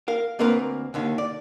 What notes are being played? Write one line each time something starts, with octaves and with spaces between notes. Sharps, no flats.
A#4 F5
D2 A#3 C4 A#4 B4 A#5
D#2 D3 D#3
D5